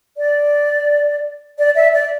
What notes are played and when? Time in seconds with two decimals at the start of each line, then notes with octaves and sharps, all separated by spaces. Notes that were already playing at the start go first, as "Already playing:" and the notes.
0.18 D5
1.58 D5
1.75 E5
1.92 D5